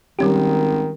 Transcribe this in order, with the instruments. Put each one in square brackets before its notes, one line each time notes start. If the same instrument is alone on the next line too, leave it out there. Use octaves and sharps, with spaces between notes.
[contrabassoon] G#1 [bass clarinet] D#3 [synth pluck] G3 C#4 G4